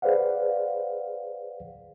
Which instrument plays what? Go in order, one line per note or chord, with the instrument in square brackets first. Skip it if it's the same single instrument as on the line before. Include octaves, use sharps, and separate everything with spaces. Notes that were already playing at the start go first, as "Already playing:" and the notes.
[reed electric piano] G#4 B4 C5 D5 F5 F#5